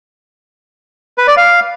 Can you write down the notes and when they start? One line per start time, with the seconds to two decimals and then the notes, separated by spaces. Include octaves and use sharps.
1.18 B4
1.28 D5
1.37 F5